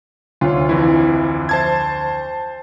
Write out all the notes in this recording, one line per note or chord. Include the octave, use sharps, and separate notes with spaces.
D2 F4 C#5
F2 E3 E4
C5 A5 G#6